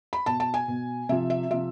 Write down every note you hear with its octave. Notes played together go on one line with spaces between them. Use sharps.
B5
B2 A5
A5
G#5
B2
C3 F3 E5
E5
C3 F3 E5